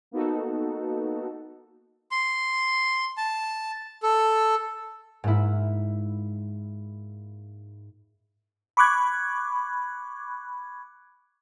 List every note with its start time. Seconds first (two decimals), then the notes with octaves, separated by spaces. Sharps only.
0.11 A#3 B3 D#4 F#4 A4
2.11 C6
3.17 A5
4.03 A4
5.24 G#2 A#3 E4
8.77 B5 C#6 D6 F#6 G#6